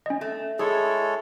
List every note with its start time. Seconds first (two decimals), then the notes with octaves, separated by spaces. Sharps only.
0.06 C#4 D#5
0.21 A3
0.59 G#3 E4 G#4 A4 C#5